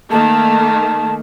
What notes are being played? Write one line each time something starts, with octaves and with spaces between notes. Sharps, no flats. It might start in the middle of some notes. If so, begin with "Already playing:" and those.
D#3 A3 A#3 A5